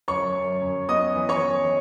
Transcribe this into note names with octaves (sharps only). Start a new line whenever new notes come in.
F#2 C#5 C#6
F#2
F#2
B3 D#5 D#6
E3
C#5 C#6
E3